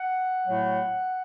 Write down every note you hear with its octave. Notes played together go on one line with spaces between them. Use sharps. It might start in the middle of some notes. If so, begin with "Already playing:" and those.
Already playing: F#5
A2 F#3 A3